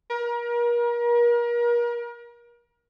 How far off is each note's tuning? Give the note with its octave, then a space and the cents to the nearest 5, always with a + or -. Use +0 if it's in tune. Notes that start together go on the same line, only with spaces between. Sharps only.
A#4 +35